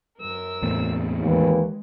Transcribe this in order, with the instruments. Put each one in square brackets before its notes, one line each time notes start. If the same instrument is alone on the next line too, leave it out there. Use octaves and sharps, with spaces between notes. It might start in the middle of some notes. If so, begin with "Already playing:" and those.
[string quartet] F#2 A#4 E6
[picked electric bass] E2 A2 C4
[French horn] D#2 [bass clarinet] E3 [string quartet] G#3